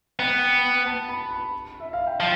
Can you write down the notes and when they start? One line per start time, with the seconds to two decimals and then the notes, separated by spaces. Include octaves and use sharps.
0.19 B3 G5
0.86 A5
1.09 B5
1.31 B5
1.80 E5
1.93 F5
2.07 G5
2.20 F3 A5